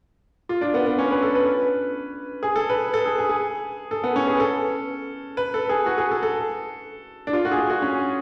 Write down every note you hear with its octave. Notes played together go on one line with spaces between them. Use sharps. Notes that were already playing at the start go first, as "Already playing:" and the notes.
F4
D4
B3
B3
C#4
B4
A4
B4
G#4
A4
B4
A4
G#4
G#4
G#4
A4
B3
C#4
G#4
B4
A4
B4
A4
G#4
F#4
G#4
A4
A4
D4
F4
F#4
G#4
F#4
F#4
C#4